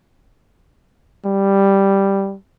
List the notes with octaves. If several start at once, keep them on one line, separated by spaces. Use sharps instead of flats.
G3